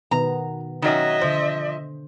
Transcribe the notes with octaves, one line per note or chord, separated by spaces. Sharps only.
B2 D#3 B3 A#5
D#3 F#3 C#4 D#5 E5
D3 F3 C5